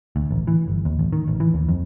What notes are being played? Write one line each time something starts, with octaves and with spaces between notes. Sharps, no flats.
D2
A1
E3
G1
D#2
A1
D#3
A1
E3
D#2
F2